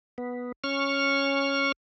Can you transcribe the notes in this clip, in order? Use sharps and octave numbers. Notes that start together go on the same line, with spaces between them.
B3
C#4 C#6 F6